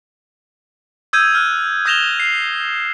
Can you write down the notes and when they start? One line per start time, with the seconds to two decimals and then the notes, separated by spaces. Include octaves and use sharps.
1.13 D#6 E6 G6 G#6 D#7
1.35 F6 F#6
1.85 D#6 G6 A#6 E7 F7 G7
2.20 C7